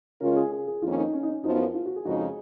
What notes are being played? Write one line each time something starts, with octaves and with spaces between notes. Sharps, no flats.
C#3 G#3 C#4 F4 A#4
G#4
G#4
G#4
F2 D#3 A#3 C#4 F4
D#4
C#4
D#4
C#4
F#2 F3 B3 D#4
F4
F4
F#4
G#4
F2 C#3 G#3 D#4 F#4
G#4